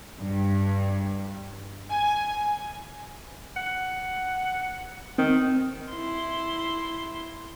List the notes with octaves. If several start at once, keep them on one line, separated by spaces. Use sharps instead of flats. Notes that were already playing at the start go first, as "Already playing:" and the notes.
G2
G#5
F#5
D#3 C4
E4 C6